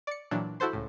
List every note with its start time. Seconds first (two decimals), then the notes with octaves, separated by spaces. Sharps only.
0.07 D5 C#7
0.31 A#2 E3 F#3 D4
0.60 E4 F#4 A4 C5 C6
0.73 C#2 A2